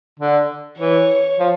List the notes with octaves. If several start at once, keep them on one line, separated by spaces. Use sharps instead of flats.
D3
E3 C#5
F3